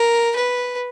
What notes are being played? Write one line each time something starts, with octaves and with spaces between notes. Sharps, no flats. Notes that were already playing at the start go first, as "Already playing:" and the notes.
Already playing: A#4
B4